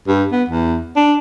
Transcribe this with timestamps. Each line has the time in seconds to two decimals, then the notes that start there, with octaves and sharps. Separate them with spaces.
0.08 G2
0.32 B3
0.49 E2
0.96 D4